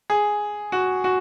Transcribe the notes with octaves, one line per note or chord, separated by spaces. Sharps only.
G#4
F#4
F#4